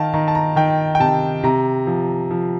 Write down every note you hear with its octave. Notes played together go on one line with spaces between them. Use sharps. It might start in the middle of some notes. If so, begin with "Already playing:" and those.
Already playing: D#3 F5 A5
D#3 A#5
A5
A#5
D#3 G5
G5
C3 A5
C3 A#5
F3
F3